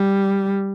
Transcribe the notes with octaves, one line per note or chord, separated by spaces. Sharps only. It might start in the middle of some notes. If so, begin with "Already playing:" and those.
Already playing: G3